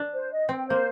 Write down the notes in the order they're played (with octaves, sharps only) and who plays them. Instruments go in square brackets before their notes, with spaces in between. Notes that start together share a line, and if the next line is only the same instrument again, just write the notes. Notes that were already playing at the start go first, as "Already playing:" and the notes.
Already playing: [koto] D4
[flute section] C5
D#5
[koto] C4 [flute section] G5
[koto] A#3 [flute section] C5